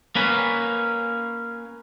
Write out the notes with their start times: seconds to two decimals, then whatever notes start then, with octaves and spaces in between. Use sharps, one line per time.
0.15 A#3 C#4 B4